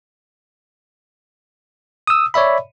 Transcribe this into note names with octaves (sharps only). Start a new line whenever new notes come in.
D#6 E6
C#5 D5 E5 B5